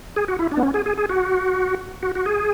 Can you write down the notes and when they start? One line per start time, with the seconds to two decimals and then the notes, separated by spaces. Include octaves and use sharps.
0.16 G#4
0.28 F#4
0.39 E4
0.52 D4
0.57 B3
0.63 C#4
0.74 G#4
0.86 G#4
0.97 G#4
1.09 F#4
2.03 F#4
2.15 F#4
2.26 G#4